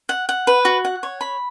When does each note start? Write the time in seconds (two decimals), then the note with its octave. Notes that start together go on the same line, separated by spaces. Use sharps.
0.09 F#5
0.29 F#5
0.47 B4
0.65 F#4
0.85 F#5
1.03 C#5
1.21 B5